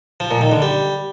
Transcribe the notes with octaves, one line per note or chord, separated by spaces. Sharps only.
F3
A#2
D#3
D3
G3